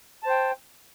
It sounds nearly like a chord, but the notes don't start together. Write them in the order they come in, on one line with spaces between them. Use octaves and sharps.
A5 C5 G5